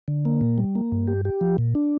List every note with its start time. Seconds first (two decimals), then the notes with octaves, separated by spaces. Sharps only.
0.08 D3
0.25 A#3
0.41 A#2
0.58 G3
0.75 A#3
0.92 G2
1.08 G4
1.25 G4
1.41 F3
1.58 A#2
1.75 D4